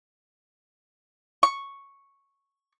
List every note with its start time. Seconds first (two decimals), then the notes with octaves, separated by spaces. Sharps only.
1.43 C#6